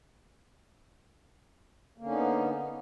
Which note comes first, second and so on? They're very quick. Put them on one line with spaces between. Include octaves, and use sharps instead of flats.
A#3 D3 C#4 D#4 B3